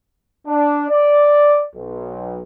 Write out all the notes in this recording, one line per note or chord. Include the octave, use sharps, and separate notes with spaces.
D4
D5
B1